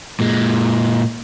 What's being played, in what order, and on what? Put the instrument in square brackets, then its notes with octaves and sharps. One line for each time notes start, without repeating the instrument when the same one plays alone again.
[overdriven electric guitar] A#2 G#3